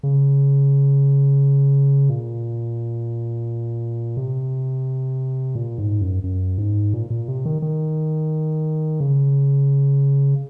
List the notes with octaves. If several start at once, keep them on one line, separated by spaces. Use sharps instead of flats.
C#3
A#2
C3
A#2
G#2
F#2
F#2
G#2
A#2
A#2
C3
D#3
D#3
C#3